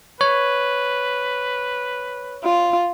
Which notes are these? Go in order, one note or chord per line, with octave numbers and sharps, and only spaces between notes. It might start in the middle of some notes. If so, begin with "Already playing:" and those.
B4 C#5
F4